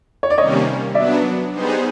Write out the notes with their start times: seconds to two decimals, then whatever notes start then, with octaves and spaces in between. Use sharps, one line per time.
0.23 C#5
0.30 D5
0.37 C3 D#3 G3 A#3 C#4 C#5 D#5
0.95 F#3 B3 D4 D5 E5
1.52 G3 B3 D#4 G#4 C5